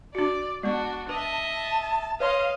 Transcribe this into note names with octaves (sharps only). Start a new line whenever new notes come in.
D4 F#4 D5
G#3 B3 D4 F#4 C#6
B4 D#5 E5 A5
A5
B4 C#5 D#5 F5 C6